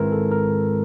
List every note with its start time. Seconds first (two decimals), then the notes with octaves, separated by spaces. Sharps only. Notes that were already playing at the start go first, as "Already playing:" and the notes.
Already playing: G#2 D#3 G#3 C4 E4 A#4 B4
0.12 A4
0.31 A#4